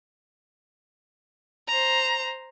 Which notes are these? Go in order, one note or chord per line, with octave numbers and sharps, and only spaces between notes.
C5 A#5